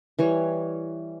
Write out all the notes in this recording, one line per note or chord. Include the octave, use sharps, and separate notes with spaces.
E3 G3 C#5